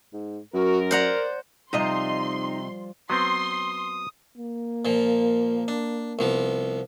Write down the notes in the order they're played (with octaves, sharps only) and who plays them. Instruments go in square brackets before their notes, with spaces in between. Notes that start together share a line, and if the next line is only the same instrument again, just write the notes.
[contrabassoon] G#2
[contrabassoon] F#2 [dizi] F#4 [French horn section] A#4
[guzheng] C5 F#5 A#5 [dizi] D5
[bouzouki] C3 D#5 A#5 [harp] F3 G3 F4 [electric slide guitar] D#4 [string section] C6
[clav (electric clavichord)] F#3 B3 C4 [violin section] C6 [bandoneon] D#6
[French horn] A#3
[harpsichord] A#2 F3
D4
C2 F3 B3